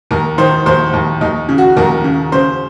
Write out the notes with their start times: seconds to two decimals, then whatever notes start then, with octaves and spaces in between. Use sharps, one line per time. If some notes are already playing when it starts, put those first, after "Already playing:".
0.11 D#2 A#4
0.38 D#3 C5
0.66 D#2 C5
0.93 D#2
1.21 D#2 D#4
1.49 C#3
1.58 F#4
1.77 D#2 A#4
2.04 C#3
2.32 C#3 C5